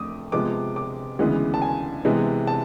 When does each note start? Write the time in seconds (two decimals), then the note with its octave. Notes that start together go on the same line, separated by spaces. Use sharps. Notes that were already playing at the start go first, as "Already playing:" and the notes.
Already playing: F2 A3 D6 D#6
0.32 C3 F3 G#3 B3 D6
0.76 D6
1.19 D2 C#3 E3 G#3 B3
1.54 A5
1.62 G#5
2.05 C3 E3 G#3 B3
2.47 A5